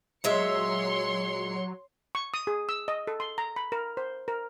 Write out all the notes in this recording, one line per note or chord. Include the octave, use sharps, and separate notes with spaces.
A#2 F#3 G#3 C#5 E5 C6 C#7
C#6
D#6
G#4
E6
D#5
A4
C6
A#5
B5
A#4
C5
A#4